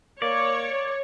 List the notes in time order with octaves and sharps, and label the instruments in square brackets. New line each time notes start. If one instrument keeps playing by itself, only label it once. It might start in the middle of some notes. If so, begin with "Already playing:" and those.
[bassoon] A#3 [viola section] C#5 [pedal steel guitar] D5